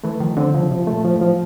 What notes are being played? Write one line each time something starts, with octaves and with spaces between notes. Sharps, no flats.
E3 A3
D#3 F3
D3 C4
C#3 F3
C3 F3
A3
A#2
F3
A2
F3